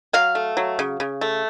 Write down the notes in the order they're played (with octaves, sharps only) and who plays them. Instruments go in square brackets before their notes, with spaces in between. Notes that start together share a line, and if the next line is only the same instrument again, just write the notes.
[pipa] F#3 F5
A3
F#3
C#3
C#3
A3